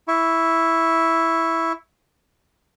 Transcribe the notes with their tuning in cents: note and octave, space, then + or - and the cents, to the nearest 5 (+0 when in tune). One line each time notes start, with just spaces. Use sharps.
E4 +0 C#6 +0